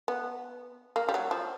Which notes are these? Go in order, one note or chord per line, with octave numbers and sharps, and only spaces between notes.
B3
A#3
G3
F#3
F3